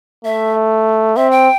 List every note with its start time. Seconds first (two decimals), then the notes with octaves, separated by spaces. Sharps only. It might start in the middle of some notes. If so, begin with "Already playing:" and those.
0.25 A3 E5
1.16 C4 E5
1.31 G5